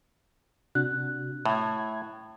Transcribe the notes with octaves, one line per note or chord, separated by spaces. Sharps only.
C3 D4 F#4 F#6
A2 E5 G#6